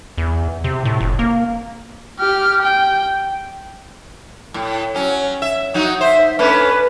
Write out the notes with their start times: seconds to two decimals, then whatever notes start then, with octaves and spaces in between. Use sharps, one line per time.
0.18 E2
0.64 C3
0.85 A2
1.00 F1
1.19 A#3
2.20 G4 F6
2.62 G5
4.54 A2
4.95 F#3 C#4
5.42 E5
5.74 F#3 D#4 F#4
6.01 C5 E5
6.39 A3 C#4 D4 B4